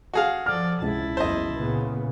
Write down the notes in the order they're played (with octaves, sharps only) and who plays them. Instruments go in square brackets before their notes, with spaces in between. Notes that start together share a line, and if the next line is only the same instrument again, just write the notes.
[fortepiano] F#4 G#4 F5
[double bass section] F3 [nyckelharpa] A4 D5 [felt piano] F6
[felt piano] C#2 [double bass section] C3 [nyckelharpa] E4 A5
[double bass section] F#1 E2 [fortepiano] C5 D#5
[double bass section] A#2 C#3 B3